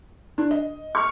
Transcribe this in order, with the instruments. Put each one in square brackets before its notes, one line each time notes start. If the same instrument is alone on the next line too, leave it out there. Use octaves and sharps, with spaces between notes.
[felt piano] D4
D#5
[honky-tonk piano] C#6 F6